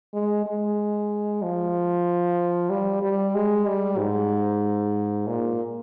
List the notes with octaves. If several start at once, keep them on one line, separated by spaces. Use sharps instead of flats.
G#3
G#3
F3
G3
G3
G#3
G3
G#2
A#2